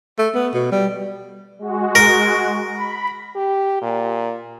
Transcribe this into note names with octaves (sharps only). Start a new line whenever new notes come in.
A3
B3
B2
G3
G#3 F#4
A#4
B5
G4
A#2